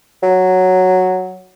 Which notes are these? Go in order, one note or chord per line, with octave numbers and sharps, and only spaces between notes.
F#3